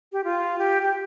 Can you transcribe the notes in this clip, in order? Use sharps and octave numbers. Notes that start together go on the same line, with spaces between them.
G4
F4
G4
G4